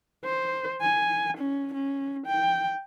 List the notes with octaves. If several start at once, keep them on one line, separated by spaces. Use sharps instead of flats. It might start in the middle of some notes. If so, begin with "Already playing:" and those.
C5
G#5
C#4
C#4
G5